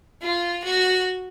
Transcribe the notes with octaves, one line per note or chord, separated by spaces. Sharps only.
F4
F#4